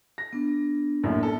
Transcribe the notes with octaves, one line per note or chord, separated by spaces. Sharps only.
A#6
B3 D4
A#1 F#2 A2
A4